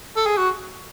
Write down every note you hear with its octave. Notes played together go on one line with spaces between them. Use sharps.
A4
G#4
F#4